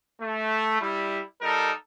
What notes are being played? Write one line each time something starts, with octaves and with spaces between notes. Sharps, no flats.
A3
G3 E4
G3 D#4 A4 A#4